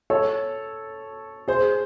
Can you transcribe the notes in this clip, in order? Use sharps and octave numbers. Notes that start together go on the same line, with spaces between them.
A4 C#5
G#4 C5